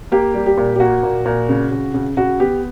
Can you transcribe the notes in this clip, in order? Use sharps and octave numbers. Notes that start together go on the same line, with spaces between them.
A#3 G4
G3
G4
A#2
G4
A#3 F#4
A#2
A#2
C#3
C#3
C#3
C#3 F#4
B3 G4